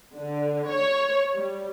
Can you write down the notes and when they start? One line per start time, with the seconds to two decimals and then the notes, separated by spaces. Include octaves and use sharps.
0.17 D3
0.69 C#5
1.35 G3